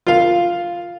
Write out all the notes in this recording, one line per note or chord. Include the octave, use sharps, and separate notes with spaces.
F4 F5